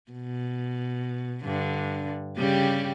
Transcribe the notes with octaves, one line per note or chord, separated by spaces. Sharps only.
B2
G2 D3
C#3 G3 G4